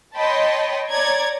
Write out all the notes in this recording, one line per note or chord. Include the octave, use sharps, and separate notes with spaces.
C#5 D#5 G5 A5 B5 C6
C#5 D5 A#5 G#6